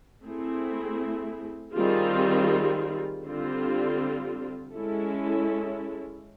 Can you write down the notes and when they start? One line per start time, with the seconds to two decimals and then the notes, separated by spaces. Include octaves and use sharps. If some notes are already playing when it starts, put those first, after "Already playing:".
0.24 A3 C4 E4 G#4
1.75 D#3 G3 C4 F4 G#4
3.25 D3 G3 C4 F4
4.75 G#3 C#4 E4 A4